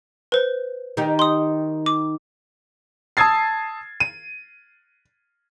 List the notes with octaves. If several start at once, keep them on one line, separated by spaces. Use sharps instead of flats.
B4 C5
D#3 D#4 G4
C6 D#6
D6
A5 D#6 E6 G#6 A6 C7
D#7